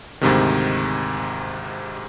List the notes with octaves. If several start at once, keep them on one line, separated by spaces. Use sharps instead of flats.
D2 G#2 C3 D#3